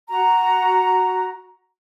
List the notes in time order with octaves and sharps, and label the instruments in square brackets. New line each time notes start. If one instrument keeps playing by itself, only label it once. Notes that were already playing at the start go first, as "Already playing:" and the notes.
[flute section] F#4 A#5